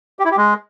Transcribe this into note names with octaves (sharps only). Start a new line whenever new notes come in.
G4
E4
G4
G#3